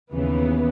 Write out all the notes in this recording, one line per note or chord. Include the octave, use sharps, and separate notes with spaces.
D#2 C#3 E3 B3